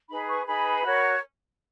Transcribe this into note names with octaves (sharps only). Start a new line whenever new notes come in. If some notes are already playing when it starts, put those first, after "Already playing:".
D#4 G#4 B4 B5
C#6
D#4 G#4 B4 B5
F#4 A#4 C#5